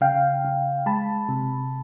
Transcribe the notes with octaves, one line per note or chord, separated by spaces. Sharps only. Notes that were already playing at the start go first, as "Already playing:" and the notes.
C#3 F5 G5
C#3
G#3 A5 B5
C3